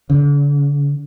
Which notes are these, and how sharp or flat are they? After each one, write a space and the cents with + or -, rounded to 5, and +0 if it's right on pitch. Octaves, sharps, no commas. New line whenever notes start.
D3 -40